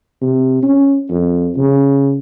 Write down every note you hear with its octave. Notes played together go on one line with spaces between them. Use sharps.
C3
C#4
F2
C#3